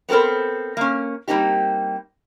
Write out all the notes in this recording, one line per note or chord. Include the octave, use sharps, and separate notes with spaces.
B3 C4 A4 A#4 C5
A#3 C#4
G3 A#3 C4 D#4 G4